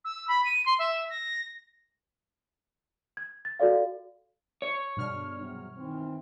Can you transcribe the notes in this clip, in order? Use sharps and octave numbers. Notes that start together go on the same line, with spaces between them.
E6
B5
D#7
C6
E5
A#6
G#6
A6
F#4 A4 D5 F5
C#5
G2 B2 D3 G#3 D4 F6
E2 C3 F#3
D#3 E3 C4